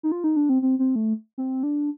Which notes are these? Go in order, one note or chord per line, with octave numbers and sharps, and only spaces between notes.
D#4
F4
D#4
D4
C4
C4
C4
A3
C4
D4